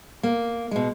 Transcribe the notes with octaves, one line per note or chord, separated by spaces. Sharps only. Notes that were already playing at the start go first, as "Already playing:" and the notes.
A#3
B2 G#3